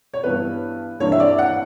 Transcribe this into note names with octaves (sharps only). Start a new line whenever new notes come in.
C#5
G2 E3 B3 D4 B4
G2 E3 A#3 D4 C#5
E5
D5
F#5